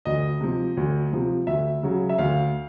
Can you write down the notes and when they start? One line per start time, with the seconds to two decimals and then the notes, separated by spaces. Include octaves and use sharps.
0.05 D2 D#5
0.40 C3 F3
0.77 D2
1.12 C3 F3
1.47 D2 E5
1.83 C#3 F#3
2.09 E5
2.18 D2 F5